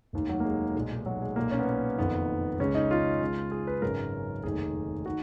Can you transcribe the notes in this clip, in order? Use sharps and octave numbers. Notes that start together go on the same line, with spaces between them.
F1 D#2 D#3
F#3
A#3
G#3
B1 A#2
F#3
G#3
B1 A#2 A#3
C#4
B3
A#3
F#1 F2 D#3 B3
C#2 C#3 C#4
D#4
F4
C#2 C#3
G#4
B4
G#1 F#2 C#3 A#4
F1 D#2 D#3 G#4
D#3 F#4